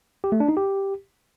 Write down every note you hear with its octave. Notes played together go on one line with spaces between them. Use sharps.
G4
A3
D4
D#4
G4